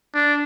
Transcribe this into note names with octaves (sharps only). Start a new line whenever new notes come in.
D4